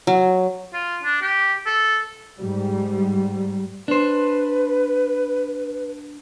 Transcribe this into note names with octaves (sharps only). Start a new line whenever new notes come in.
F#3
F4
D4
G4
A4
G#2 G3
D4 B4 C5